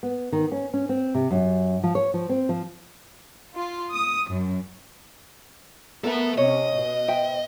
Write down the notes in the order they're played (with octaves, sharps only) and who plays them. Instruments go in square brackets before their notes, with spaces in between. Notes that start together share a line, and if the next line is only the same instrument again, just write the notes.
[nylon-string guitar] B3
D#3
C#4
C#4
C4
C3
F#2
F3
C#5
F3
C4
F3
[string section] F4
D#6
F#2
[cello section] B3 [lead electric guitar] A4 E5 [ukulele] A#4
[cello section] C3 C#4 [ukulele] C#5 [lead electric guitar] D#5
[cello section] B2
[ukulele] C5 E5 G5